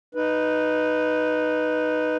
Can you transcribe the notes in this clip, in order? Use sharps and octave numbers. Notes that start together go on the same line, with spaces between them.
D#4 B4